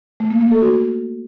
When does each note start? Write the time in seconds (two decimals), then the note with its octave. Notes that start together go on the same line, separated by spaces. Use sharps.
0.20 A3
0.31 A#3
0.41 A#3
0.51 A4
0.62 F#4